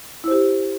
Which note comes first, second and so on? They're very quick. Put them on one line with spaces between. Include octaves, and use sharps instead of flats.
E4 C5 G4